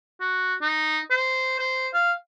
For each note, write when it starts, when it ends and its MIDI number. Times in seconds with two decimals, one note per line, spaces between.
0.20 0.54 66
0.62 0.99 63
1.10 1.54 72
1.59 1.88 72
1.94 2.13 77